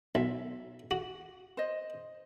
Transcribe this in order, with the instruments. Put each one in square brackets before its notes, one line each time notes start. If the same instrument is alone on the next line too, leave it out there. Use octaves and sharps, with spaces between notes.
[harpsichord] B1 [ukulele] E5
[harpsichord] F#4
[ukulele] C5 D#5